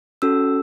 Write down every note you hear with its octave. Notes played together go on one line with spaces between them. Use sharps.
C#4 F#4 A4 E6